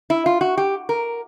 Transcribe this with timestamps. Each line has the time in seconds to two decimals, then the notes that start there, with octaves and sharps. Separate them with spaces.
0.10 E4
0.26 F4
0.41 F#4
0.57 G4
0.89 A#4